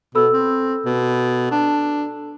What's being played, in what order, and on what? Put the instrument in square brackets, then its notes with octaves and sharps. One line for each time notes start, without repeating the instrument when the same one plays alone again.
[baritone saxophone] B2 [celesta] A4 B5 E6
[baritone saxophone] C4
B2
D4